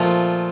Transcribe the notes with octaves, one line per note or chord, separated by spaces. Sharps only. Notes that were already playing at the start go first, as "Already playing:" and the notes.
Already playing: A#2 F3 A3